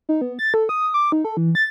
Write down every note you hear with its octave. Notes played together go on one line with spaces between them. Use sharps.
D#4
B3
A6
A4
D#6
D6
D#4
A4
E3
A6